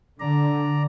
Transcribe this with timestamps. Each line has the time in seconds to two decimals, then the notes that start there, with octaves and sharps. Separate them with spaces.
0.20 D3 D5 A#5